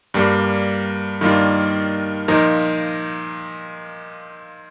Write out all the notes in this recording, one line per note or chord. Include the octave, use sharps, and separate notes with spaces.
G2 G3 A#3
G2 D#3 G3 A#3 F4
A#2 F3 D#4 A#4